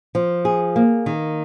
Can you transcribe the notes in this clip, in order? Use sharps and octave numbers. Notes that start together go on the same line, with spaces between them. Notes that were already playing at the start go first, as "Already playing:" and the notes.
F3
G#4
A#3
D#3